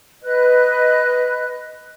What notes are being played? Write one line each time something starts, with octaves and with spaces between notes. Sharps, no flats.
B4 D#5 F#6